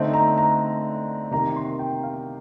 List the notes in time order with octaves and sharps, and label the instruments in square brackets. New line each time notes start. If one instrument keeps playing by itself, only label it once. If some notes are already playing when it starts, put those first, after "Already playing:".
Already playing: [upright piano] D3 A3 C4 D#4
A#5
A#5
C3 D#3 A#3 A#5
C6
G5
F5